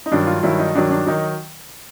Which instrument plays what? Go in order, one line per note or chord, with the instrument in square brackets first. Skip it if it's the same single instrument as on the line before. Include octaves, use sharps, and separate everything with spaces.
[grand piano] D#4
G2 D#3 F#3 D4
F4
G2 D#3 F#3 E4
D#4
G2 D#3 F#3 D4
D4
D#3 F#3 D#4